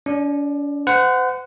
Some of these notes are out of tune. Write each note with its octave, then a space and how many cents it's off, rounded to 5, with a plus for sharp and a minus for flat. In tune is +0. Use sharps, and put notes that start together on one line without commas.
D4 -45 D5 +25
C5 -40 F#5 +0